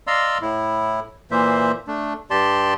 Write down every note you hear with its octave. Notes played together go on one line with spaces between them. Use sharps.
D5 D#5 F5 A#5 C6 E6
A2 E4
A#2 E3 A#3 C5 E5
A3 D4
G2 G4 D5 A5 C6